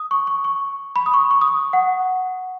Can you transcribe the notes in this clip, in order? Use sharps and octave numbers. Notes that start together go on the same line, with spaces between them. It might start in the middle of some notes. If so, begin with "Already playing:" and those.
Already playing: D#6
C#6
C#6
C#6
B5
D#6
C#6
C#6
D#6
C#6
F#5